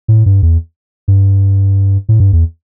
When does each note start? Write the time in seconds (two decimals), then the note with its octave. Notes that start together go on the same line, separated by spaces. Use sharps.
0.08 A2
0.26 G2
0.43 E2
1.08 G2
2.09 A2
2.20 G2
2.33 E2